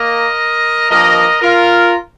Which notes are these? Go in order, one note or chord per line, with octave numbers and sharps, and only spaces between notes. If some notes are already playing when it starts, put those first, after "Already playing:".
Already playing: A#3 A#4 D#5
G2 F3 A#3 A#4 D#5
F4 A#4